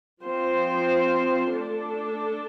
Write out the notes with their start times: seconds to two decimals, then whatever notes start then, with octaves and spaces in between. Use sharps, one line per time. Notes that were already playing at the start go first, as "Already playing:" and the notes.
0.23 F3 C4 F4 C5
1.53 A3 D4 A4